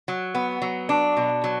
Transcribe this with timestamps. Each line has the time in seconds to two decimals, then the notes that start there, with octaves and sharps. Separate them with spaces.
0.08 F#3
0.35 B3
0.62 F#3
0.89 D4
1.17 B2
1.44 F#3